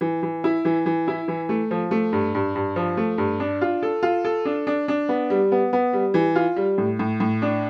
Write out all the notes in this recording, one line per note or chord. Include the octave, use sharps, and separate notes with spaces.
E3
E3
E4
E3
E3
E4
E3
A3
F3
A3
G2
G2
G2
F3
A3
G2
D4
F4
A4
F4
A4
D4
D4
D4
B3
G3
B3
B3
G3
E3
F4
G3
A2
A2
A2
D4